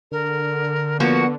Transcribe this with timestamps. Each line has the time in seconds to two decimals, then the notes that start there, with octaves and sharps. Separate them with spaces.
0.12 D3 A#4
1.00 F3 A#3 B3 F#4 F#5